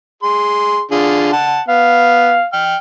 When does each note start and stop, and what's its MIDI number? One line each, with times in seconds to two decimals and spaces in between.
0.23 0.82 68
0.23 0.82 84
0.91 1.31 50
0.91 1.31 65
0.91 1.31 68
1.33 1.61 78
1.33 1.61 81
1.68 2.38 59
1.68 2.46 77
2.53 2.76 79
2.53 2.76 89